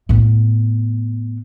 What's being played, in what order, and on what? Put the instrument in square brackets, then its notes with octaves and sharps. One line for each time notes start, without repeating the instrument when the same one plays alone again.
[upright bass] A2 B3